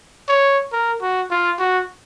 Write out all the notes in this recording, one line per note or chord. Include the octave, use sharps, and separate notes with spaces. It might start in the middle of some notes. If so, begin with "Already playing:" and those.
C#5
A#4
F#4
F4
F#4